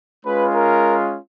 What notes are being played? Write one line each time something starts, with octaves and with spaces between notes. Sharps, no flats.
G#3 C#4 F4 B4
A#4